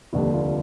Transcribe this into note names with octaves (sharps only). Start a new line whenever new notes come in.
F1 D#2 D3 G3 D4
F4